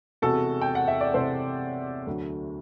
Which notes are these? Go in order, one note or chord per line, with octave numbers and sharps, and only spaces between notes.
E1 E2 C3 F#4 A4
G5
F#5
E5
D5
E1 E2 C3 A4 C5
D2 D3 F#3